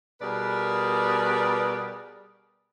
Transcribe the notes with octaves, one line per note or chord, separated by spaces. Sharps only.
B2 G3 G#4 A#4 B4 D5